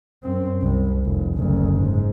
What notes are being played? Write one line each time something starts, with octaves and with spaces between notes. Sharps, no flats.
F#2 C4
C2
F1
F#1 D2
G#2